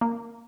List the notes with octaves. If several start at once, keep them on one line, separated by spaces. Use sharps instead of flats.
A#3